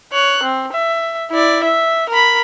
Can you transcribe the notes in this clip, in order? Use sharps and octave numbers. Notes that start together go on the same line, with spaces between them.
C#5 F#6
C4
E5
E4 D5
E5
A#4 B5